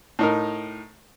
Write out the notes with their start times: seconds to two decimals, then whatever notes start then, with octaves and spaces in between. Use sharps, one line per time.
0.19 A2 D#4 A#4